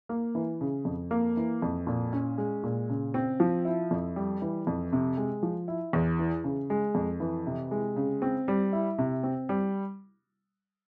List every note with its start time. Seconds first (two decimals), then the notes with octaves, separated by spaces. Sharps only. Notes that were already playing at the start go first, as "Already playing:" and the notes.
0.09 A#3
0.35 E3
0.61 C#3
0.85 F2
1.11 A#3
1.37 E3
1.62 F2
1.87 A#2
2.13 C#4
2.38 G#3
2.63 A#2
2.89 C#3
3.14 C4
3.40 F3
3.65 E4
3.91 F2
4.16 G3
4.42 E3
4.67 F2
4.92 C3
5.18 G#3
5.43 F3
5.68 E4
5.93 E2
6.19 E3
6.44 C#3
6.70 G#3
6.95 F2
7.20 E3
7.46 C3
7.71 G#3
7.96 C#3
8.22 C4
8.48 G3
8.73 E4
8.98 C3
9.23 C4
9.49 G3